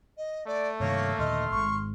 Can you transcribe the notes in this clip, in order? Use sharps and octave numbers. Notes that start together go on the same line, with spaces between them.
D#5
A3 D5
G2 C3 D#3 A#3 C#5
D#2 A#2 D3 D#5 C6 F6
G#1 G#2 C#6